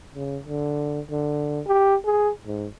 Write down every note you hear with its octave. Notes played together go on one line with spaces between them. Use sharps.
C#3
D3
D3
G4
G#4
G#2